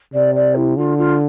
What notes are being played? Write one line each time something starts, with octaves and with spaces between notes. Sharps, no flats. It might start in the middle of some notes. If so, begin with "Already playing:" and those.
C3 D5
D5
E4
D3 F4
F4